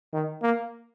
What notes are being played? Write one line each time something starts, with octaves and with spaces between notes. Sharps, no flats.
D#3
A#3